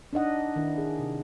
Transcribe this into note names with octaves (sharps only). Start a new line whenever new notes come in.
D4 D#4 D#5 F#5
D#3 D4 E4
G#4
C3